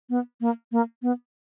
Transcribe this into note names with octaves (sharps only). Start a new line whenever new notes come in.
B3
A#3
A#3
B3